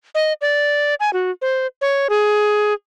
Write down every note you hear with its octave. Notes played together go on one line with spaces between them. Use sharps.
D#5
D5
G#5
F#4
C5
C#5
G#4